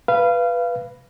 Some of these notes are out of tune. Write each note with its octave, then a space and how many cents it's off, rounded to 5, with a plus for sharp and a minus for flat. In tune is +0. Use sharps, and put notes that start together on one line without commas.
B4 +0 F5 -25